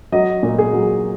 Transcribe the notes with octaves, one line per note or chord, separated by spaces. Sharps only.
F#3 D#5
A#2
G#4
F#3